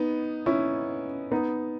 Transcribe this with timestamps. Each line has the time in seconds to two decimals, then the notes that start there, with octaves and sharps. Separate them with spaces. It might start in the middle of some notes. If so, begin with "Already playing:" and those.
Already playing: B3 D#4
0.46 C#4 E4
1.31 B3 D#4